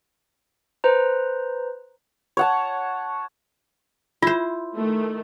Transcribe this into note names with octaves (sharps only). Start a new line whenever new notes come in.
B4 C5 A#5
C#5 F#5 A5
E4 F4 C5
D#3 A3